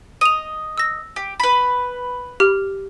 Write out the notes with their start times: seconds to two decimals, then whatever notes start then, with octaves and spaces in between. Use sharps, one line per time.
0.21 D#5 D#7 F7
0.78 E6 A#6
1.16 G4
1.40 B4 B5
2.40 G4 F6